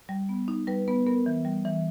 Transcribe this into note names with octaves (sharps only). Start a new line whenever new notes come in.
G3
B3
D#4
G3 B4
B3 B4
B3 A#4
E3
G3
E3